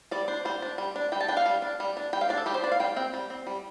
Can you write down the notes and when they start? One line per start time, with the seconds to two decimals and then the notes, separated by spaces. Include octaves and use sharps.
0.11 G3 D5
0.28 D4 C5
0.45 G3 C5
0.62 D4
0.78 G3
0.96 D4
1.12 G3 G5
1.21 A5
1.28 D4 G5
1.37 F5
1.46 G3
1.62 D4
1.80 G3
1.97 D4
2.13 G3 G5
2.21 F5
2.29 D4 D5
2.37 A4
2.46 G3 G4
2.54 C5
2.63 D4 D5
2.72 F5
2.79 G3 G5
2.96 C4 G5
3.14 G3
3.30 C4
3.47 G3